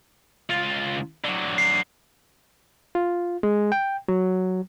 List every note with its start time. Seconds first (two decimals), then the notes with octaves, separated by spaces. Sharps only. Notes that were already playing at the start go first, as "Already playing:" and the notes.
0.50 C#2 F4
1.25 D3 F#3
1.58 C7
2.95 F4
3.43 G#3
3.72 G5
4.08 F#3